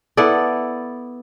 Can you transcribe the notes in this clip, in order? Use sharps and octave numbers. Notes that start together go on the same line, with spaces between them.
B3 E4 A4 D5